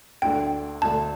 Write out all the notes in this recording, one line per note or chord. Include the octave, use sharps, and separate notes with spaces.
D2 D3 A3 G5
D2 D3 A3 A5